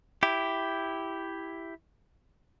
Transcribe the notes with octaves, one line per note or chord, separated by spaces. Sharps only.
E4 G4